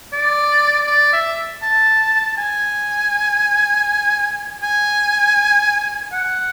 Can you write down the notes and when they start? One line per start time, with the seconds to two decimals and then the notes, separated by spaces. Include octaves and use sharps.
0.13 D5
0.87 D5
1.13 E5
1.63 A5
2.38 G#5
4.63 G#5
6.12 F#5